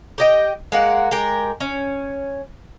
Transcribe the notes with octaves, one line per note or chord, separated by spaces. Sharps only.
G4 D#5 G5
G#3 A#3 F#5
G#3 G4 A#4 G5
C#4